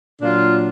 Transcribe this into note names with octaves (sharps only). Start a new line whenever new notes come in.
A#2 F#3 D4 F4